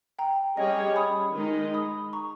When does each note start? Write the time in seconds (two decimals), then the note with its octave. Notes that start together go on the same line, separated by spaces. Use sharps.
0.19 G5 A#5
0.57 G3 C#4 G#4 C#5 D#5 G5
0.96 B5 D#6
1.35 D#3 G#3 D#4
1.74 B5 D#6
2.13 A#5 C#6